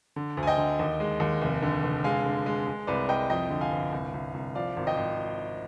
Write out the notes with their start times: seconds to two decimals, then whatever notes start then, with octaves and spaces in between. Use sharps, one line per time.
0.16 D3
0.37 D2
0.43 G#5
0.47 D#5 G5
0.57 D3
0.79 D#2
1.00 G#3
1.20 D#2
1.42 F1
1.62 D3
1.84 F1
2.04 G#3 F5 G#5
2.25 D3
2.46 G#3
2.67 G#3
2.87 C2 B4 D5
3.09 C2 D#5 G5
3.30 F2 D#5 G5
3.50 D3
3.61 F5 G#5
3.72 G1
3.92 C2
4.14 C2
4.34 C2
4.55 F3 D5 F5
4.77 G#1
4.87 D#5 G5
4.97 G#1